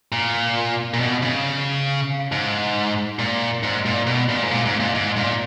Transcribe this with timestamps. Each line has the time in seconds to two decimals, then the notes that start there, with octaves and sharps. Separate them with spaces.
0.12 A#2
0.94 A#2
1.00 B2
1.22 C#3
2.32 G#2
3.19 A#2
3.63 G#2
3.86 A#2
4.07 B2
4.29 A#2
4.43 G#2
4.51 A#2
4.66 G#2
4.80 A#2
4.95 G#2
5.17 A#2